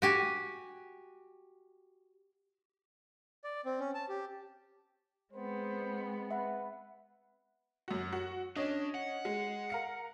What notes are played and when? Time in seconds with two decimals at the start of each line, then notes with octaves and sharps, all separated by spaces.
0.02 F#4 G4 G#5
3.44 D5
3.65 C4
3.80 C#4
3.95 A5
4.09 G4
5.33 G#3 B3 C4 C5
6.31 B4 E5 F#5 B5
7.88 F#2 F#4
8.13 F#4
8.56 C#4 D4 C#5 D#5
8.95 F#5
9.25 G#3
9.70 A#4 F5 C#7